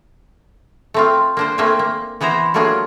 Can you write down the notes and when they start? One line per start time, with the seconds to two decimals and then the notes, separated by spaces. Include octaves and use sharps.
0.94 A3 C4 F4
1.37 A#3 D4 C5
1.58 A3 A#3 C4 D4 E5 G#5
1.79 A#3
2.21 E3 B3 E4 C5 A#5
2.54 F#3 A3 A#3 D4 F4 G#4